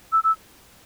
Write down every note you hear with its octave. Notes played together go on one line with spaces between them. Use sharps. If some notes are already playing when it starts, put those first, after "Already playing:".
E6
E6